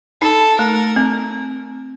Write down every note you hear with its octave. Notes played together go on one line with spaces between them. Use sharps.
D#4 A4
A3 A#4
C4